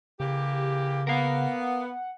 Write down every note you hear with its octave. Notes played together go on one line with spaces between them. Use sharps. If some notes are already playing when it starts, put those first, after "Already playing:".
C#3 E3 A#3 G4
B3 A#4 F5 F#5